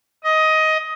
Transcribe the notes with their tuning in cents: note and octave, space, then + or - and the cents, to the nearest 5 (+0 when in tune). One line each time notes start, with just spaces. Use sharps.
D#5 +15